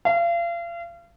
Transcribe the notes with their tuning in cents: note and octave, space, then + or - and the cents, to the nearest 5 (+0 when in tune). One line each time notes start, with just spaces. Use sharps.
F5 -35